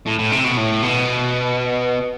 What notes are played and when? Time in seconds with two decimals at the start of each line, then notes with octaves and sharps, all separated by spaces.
0.06 A2
0.18 A2
0.32 C3
0.45 B2
0.57 A2
0.83 B2